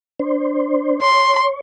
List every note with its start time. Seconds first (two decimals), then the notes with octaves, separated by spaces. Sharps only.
0.20 D4 C5
1.01 C#5 C6